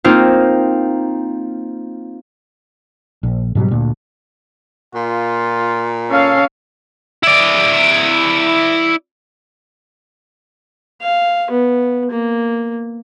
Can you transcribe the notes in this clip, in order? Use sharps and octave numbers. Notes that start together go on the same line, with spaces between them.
A#3 C4 D#4 F4
A#1
G#2 B2 F#3 G3
D2 A#2
A#2 F4
C#4 A4 F5
E4 D5
F5
B3
A#3